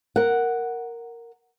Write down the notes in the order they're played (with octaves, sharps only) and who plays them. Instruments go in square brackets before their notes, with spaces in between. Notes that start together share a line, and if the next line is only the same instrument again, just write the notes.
[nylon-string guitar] A#4 F#5